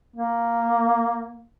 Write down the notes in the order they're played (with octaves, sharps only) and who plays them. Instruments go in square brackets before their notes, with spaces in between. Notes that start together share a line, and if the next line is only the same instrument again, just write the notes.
[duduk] A#3